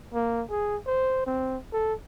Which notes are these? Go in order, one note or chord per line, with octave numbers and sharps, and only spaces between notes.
A#3
G#4
C5
C4
A4